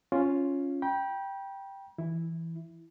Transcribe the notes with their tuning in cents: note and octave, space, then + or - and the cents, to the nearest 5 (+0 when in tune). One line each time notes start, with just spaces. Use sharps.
C#4 +0 F4 +0
G5 +0 B5 -40
E3 +0 E4 +0